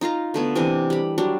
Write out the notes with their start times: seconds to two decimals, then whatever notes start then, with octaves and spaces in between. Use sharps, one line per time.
0.01 D#4 F4 F5 A#5
0.34 D3 A3 B3
0.55 C3 E3 D4 D#5
0.90 G3 B5
1.18 F#3 G3 D4